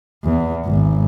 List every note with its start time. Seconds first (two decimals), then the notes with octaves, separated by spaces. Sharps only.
0.24 E2
0.66 G#1